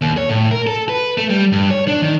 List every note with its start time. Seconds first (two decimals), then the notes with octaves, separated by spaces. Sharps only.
0.01 D#2
0.17 C#5
0.29 A2
0.51 A#4
0.67 A4
0.89 B4
1.18 A3
1.29 G3
1.52 G2
1.71 C#5
1.88 D4
2.02 D#3